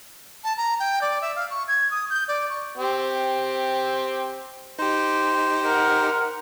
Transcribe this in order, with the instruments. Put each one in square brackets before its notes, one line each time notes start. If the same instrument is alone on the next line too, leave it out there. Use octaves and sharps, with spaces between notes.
[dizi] A5
A#5
G5
D5
E5
F5
C#6
G#6
D#6
G6
D5
C#6
[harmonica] C4 G4
[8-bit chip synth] D#4 G4 [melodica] C5
[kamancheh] A#4 F#5